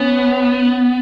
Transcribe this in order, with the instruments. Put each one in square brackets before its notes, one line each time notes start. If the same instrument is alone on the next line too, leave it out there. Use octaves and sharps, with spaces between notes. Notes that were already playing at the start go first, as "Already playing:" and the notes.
Already playing: [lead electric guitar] B3 [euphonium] C#4